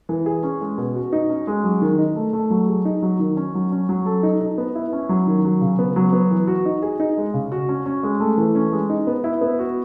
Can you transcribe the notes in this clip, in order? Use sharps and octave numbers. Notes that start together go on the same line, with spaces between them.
E3
G#4
C#4
G#3
B2
F#4
D#4
C#4
G#3
F#3
D#3
D#4
A3
A3
F#3
G#4
D#4
F#3
D#3
C#4
F#3
C#4
F#3
A4
D#4
D#4
B3
E4
C#4
F#3
D#3
F#3
C#3
B3
F#3
B3
E3
F#4
D#4
G#4
D#4
G#3
C#3
F#4
C#4
C#4
G#3
A3
E3
C#4
G#3
D#4
B3
E4
B3
F#4